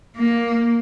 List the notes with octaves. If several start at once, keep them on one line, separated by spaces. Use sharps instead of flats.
A#3